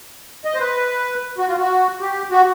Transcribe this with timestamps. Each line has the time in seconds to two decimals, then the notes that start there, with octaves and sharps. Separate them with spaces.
0.45 D#5
0.55 C5
0.60 B4
1.38 F#4
1.48 F4
1.58 F#4
2.01 G4
2.31 F#4